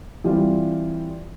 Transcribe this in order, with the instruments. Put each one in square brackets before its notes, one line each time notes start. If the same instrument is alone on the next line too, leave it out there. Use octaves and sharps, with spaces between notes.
[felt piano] E3 G3 C4 F4